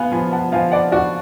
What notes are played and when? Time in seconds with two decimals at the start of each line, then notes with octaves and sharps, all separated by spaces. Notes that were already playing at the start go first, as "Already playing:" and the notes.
Already playing: B3 F5 G#5
0.12 F3 G#5 B5
0.32 F#5 A5
0.52 F3 F5 G#5
0.72 D5 F#5
0.92 F#4 D5 F#5